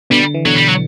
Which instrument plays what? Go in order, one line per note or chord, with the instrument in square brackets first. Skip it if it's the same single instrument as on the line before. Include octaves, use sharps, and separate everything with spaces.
[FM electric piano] B2 D3 [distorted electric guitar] G3
[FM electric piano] E3
[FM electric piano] B2 D3 [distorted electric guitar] F#3
[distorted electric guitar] G3
F#3